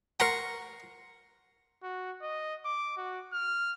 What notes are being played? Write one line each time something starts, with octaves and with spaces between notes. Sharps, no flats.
A#4 F#5 A#5 C6 C#6
F#4
D#5
D6
F#4
F6